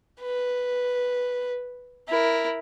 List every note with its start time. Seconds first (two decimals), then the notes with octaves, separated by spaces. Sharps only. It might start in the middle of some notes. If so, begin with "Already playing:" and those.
0.22 B4
2.09 E4 A#4